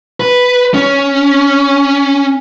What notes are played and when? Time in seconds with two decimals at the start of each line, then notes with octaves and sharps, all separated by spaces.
0.20 B4
0.74 C#4